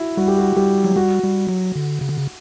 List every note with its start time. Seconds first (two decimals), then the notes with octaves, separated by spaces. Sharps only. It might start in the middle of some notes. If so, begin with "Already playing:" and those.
Already playing: E4 F#4
0.17 G3 F#4
0.28 G4
0.38 F#4
0.56 G3 G4
0.85 F#3
0.96 G3 F#4
1.23 G3
1.49 F#3
1.76 D3
2.01 C#3
2.09 D3
2.18 C#3